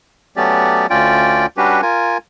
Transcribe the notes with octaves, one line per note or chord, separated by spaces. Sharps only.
F#3 A3 B3 C#4 G4 D5
D2 C#4 F4 D5 G5
G3 C#4 D4 F#4 G4 B4
F4 A#4 G#5